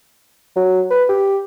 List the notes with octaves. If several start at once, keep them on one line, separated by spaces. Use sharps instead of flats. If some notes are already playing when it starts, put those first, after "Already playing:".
F#3
B4
G4